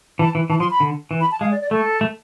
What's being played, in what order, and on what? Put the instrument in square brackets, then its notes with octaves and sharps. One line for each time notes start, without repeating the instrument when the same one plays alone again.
[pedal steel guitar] E3 [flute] A5
[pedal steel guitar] E3
[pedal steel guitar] E3 [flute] A5
[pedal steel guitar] F3 [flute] C6
[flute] B5
[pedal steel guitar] D3
E3
[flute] B5
A5
[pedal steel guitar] G#3 [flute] F5
[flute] D5
D5
[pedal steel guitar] A3 [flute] A4
[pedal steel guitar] A3